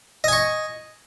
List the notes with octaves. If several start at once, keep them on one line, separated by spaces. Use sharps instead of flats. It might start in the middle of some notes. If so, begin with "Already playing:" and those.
D#5 G#5 C#6